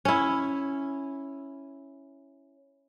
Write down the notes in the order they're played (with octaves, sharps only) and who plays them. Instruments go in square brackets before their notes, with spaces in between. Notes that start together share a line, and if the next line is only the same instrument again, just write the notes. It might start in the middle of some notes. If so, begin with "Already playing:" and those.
[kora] C#4 E4